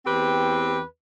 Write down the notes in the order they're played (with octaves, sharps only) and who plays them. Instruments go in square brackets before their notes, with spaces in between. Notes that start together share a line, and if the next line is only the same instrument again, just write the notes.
[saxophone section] E2 C4 G4 B4